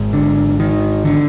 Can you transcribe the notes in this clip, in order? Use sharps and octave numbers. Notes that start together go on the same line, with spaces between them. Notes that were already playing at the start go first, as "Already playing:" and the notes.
Already playing: G#1 G#2
D3
D#3
D3